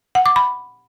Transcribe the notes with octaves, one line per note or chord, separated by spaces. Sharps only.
F#5
D6
B5